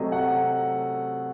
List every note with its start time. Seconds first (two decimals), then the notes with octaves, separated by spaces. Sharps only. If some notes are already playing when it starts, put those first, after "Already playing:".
Already playing: C3 F#3 A3 D#5
0.12 F#5